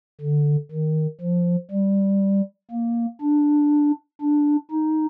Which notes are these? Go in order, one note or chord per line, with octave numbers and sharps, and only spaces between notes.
D3
D#3
F3
G3
A#3
D4
D4
D#4